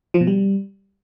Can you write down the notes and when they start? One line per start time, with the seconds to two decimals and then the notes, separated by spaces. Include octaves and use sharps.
0.14 F3
0.21 B2
0.27 G3